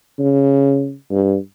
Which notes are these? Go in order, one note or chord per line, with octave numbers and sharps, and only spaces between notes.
C#3
G2